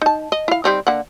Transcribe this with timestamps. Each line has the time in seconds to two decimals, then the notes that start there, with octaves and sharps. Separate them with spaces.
0.02 D#4 A5
0.32 D#5
0.48 E4 F5
0.64 G3 C4 D#4
0.87 D3 A#3 F#5